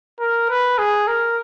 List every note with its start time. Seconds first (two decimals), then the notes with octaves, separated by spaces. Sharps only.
0.20 A#4
0.50 B4
0.79 G#4
1.08 A#4